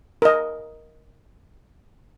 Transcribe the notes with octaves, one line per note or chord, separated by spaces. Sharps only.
A#4 D#5